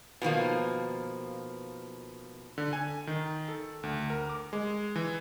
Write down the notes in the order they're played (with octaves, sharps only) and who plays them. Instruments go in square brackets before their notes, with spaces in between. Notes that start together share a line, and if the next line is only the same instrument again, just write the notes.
[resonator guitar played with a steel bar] B2 D#3 F3 A#3
[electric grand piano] D3
G#5
D#3
A4
D2
A#4
D6
G#3
E3